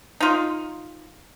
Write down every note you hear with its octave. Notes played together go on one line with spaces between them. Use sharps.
D#4 F4